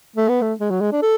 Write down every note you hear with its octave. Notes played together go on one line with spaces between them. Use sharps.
A3
B3
A3
G#3
F#3
G#3
D4
A4